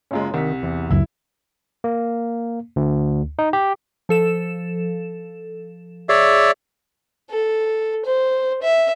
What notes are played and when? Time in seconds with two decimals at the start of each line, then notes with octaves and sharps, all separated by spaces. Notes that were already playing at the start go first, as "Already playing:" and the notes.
0.11 F#1 F#2 G#3 C#4 F4
0.34 C2 D#3 B6
0.63 E2
0.91 C#2 F#2 E4
1.84 A#3
2.76 D2
3.39 D#4
3.53 G4
4.09 F3 A4 E7
6.09 G#4 C#5 D5 E5
7.30 A4
8.06 C5
8.62 E5